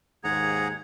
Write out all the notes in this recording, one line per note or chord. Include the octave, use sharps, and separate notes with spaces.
D#2 G#2 G#4 F#5 A#5 G#6